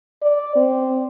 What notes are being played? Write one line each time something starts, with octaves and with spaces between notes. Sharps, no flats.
D5
C4